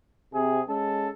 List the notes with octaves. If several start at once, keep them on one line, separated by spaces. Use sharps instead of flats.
C3 G#4
G#3 C#4 A4